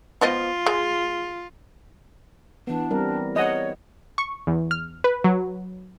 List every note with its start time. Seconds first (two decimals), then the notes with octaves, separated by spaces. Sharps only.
0.21 F3 B3 F4 D#5
0.66 G#3
2.67 E3 B3 D4
2.91 G3 C4 A#4
3.36 C#5 D#5 F#5
4.18 C#6
4.47 E2
4.71 F6
5.04 B4
5.24 F#3